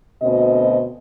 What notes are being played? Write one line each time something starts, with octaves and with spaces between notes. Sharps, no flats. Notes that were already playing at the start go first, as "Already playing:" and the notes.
D2 B2 C4 D#5